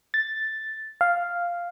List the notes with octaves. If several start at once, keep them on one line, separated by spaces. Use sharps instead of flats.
A6
F5